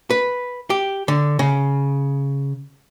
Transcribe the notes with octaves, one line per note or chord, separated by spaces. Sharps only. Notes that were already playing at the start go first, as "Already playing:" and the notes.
B4
G4
D3
C#3